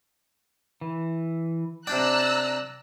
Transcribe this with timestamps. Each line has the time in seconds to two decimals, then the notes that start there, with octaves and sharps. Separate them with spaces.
0.81 E3
1.87 C3 D4 D5 G5 A#5 E6 F#6